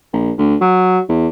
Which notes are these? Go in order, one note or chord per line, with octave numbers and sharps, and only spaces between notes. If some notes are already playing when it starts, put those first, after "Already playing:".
A#1
D2
F#3
E2